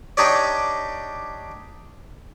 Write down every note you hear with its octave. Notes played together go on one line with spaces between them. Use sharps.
D4 D#4 G4 C#5 D5